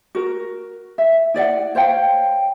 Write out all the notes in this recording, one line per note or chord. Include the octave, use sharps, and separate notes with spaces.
F#4 A#4
E5
E4 D5 D#5 F#5
C5 C#5 F5 G5